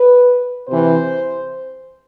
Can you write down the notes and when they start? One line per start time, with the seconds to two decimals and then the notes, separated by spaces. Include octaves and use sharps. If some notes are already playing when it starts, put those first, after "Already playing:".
Already playing: B4
0.68 C3 E3 C5